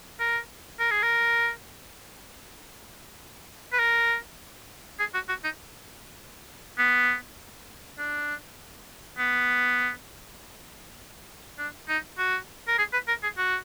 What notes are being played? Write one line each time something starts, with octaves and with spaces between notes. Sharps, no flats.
A#4
A#4
G#4
A#4
B4
A#4
G#4
F#4
F#4
D#4
B3
D4
B3
D4
D#4
F#4
A#4
G#4
B4
A#4
G#4
F#4